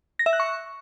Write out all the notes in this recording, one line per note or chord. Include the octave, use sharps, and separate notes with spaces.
A#6
E5
F#6
C#6